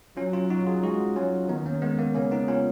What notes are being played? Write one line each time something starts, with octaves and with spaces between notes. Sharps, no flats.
F#3 C#4 F4
C#4 F4
D#4 F#4
F4 G#4
G#3 D#4 F#4
F#3 C#4 F4
D#3 B3 D#4
A#3 C#4
G#3 B3
A#3
C#3 A#3 C#4
B3 D#4
C#4 F4